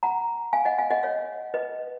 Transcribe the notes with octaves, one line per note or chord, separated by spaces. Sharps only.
F#5 A#5
F5 G#5
D#5 F#5
F5 G#5
D#5 F#5
C#5 F5
B4 D#5